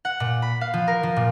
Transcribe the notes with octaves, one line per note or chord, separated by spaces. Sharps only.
F#5
A#2
B5
F5
F3
A#4
F3
A#2